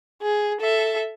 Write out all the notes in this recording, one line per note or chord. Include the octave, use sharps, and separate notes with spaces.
G#4
A4 E5